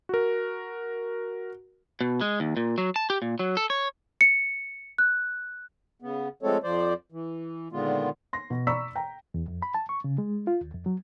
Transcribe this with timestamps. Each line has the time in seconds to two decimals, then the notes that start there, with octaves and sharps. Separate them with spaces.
0.09 F#4 A#4
2.01 B2
2.21 G#3
2.40 D#2
2.57 A#2
2.78 F#3
2.96 A5
3.10 G4
3.22 A#2
3.39 F#3
3.57 A4
3.70 C#5
4.21 C#7
4.98 F#6
6.02 C#3 B3
6.43 F3 G#3 A3 C4 A4 C#5
6.63 F2 F3 C5 D5
7.12 E3
7.72 A#2 D3 D#3 G#3 B3 F4
8.33 C6 A#6
8.50 B2
8.67 D5 A#5 B5 C#6 E6 B6
8.95 G5 A#5
9.34 E2
9.48 F2
9.62 B5
9.74 A5
9.89 C#6
10.04 C#3
10.18 G#3
10.47 F4
10.61 D#2
10.75 F2
10.86 F#3